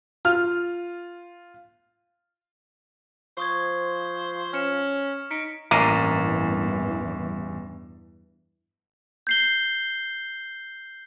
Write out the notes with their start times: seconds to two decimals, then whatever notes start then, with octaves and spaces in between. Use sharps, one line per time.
0.25 F4 F6
3.38 F3 C5 C#6 D#6 G#6
4.53 C#4 F6 C#7 E7
5.31 D#4 B6 C#7 D7
5.71 A1 E2 G2 E3 A#3 D#7
9.27 G6 C7 G7